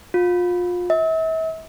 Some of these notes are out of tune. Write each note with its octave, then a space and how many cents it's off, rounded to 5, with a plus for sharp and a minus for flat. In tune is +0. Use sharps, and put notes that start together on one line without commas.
F4 +30
E5 -40